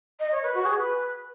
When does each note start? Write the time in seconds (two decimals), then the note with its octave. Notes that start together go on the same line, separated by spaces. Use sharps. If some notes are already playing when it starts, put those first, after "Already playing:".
0.20 D#5
0.31 C#5
0.43 B4
0.54 F#4
0.65 G#4
0.77 B4